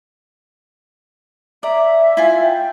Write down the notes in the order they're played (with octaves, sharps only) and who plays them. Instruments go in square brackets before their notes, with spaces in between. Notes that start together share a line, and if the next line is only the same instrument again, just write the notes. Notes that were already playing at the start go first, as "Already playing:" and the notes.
[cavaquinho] D5 A#5 [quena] E5
[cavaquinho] E4 F4 G#5
[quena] G5